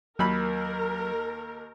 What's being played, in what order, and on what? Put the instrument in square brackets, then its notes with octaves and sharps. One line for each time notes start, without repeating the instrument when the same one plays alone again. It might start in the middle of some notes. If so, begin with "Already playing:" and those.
[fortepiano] D#2 B5 [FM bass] F#3 [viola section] A#4